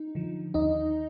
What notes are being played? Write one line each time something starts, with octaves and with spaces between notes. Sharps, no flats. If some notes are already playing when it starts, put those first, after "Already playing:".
Already playing: D#4
D3 F3
D#2 D#4 D#5